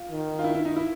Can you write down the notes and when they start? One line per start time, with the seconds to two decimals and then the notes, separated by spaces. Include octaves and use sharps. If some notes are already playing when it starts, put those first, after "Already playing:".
Already playing: F4
0.11 D#3
0.39 F4
0.44 E4
0.55 E4
0.65 D#4
0.77 E4